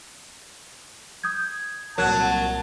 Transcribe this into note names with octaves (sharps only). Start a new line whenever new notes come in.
D#6 G6 G#6
C2 A#2 F#3 A#4 A5 F#6 G#6